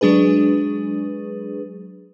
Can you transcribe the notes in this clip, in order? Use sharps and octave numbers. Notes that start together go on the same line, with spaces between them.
F#3 G#3 D4 G#4 B4